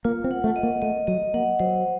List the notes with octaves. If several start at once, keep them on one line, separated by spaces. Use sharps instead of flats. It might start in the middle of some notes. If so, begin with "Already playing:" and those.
A#3 F4
C4
F#5
A3
D#5
A#3
A3 D#5
F#3 D#5
A#3 F#5
F#3 C5